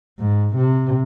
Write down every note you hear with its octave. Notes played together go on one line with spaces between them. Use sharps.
G#2
C3